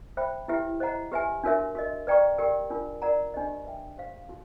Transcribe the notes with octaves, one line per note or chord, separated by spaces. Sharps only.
C5 E5 G5 B5
E4 G4 B4 E5 G5
C5 D#5 F#5 A#5
G4 B4 E5 G#5
D4 F#4 A#4 C#5 E5
F#4 A#4 D#5
B4 D5 G5 A#5 C#6
G4 A#4 D5 G5
D4 F4 A#4
A#4 D5 F#5 A#5
D4 G4 C5 D#5
B4 E5 G5
G4 C5 F5
D#4 F#4